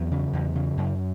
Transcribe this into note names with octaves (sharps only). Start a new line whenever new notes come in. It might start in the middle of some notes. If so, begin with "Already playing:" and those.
Already playing: E2 F#3 B3
C#3
E2
C#3
F#2